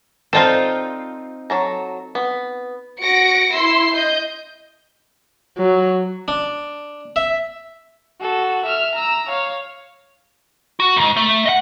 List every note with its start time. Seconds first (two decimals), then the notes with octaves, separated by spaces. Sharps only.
0.33 C4 D#4 F4 A4 C5 D5 G5 A5
1.50 F#3 A4 A#5
2.15 B3
3.00 F#4 A#6 C#7 D7
3.53 E4 C6 E6 C7
3.93 D#5 G6
5.57 F#3
6.28 D4
7.16 E5
8.21 F#4 A4
8.65 E5 F6
8.95 A#5 E6
9.29 C#5 F5
10.80 F#4
10.96 C2 G#2
11.16 A3
11.46 D#5 F#5